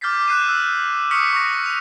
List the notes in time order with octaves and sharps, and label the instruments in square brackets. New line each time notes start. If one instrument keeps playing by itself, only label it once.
[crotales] D6 F6 G6 A6 B6 C7
F#6 G6 C7 D#7 E7
E6
C#6 D#6 F6 B6 C#7 F#7
C#6 D#6 A#6
D#7 F7